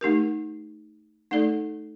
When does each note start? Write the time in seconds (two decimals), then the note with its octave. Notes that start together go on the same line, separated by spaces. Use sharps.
0.01 A3 D#4 G4 A#4
1.31 A3 D#4 A4 D5